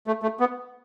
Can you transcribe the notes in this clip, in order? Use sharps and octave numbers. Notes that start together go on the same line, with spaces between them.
A3
A3
B3